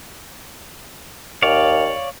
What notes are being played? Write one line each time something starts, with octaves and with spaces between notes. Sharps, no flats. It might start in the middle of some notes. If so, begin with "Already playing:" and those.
D#2 C#5 D5 F5